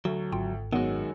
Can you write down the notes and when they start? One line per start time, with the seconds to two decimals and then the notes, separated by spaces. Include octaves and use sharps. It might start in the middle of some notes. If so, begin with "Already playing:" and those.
0.05 D2 F#3
0.32 G#1 F4 G5
0.73 F#2 D#3 G#3 B3 C#4 F#4